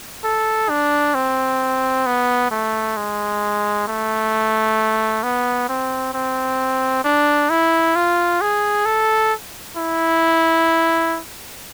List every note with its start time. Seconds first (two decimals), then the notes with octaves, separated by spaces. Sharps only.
0.24 A4
0.70 D4
1.15 C4
2.06 B3
2.51 A3
2.97 G#3
3.88 A3
5.23 B3
5.69 C4
6.14 C4
7.04 D4
7.50 E4
7.96 F4
8.41 G#4
8.86 A4
9.76 E4